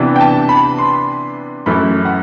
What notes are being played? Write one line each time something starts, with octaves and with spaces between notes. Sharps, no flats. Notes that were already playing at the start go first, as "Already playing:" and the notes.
Already playing: C3 E3 B3 D4
G5
A5
B5
C6
F#2 E3 A3 E4 B5
F#5